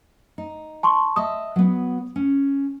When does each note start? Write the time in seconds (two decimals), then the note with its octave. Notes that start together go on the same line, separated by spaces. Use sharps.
0.38 D#4
0.83 A5 C6 C#6
1.16 D#5 E5 A5 D#6
1.56 F#3 B3
2.16 C#4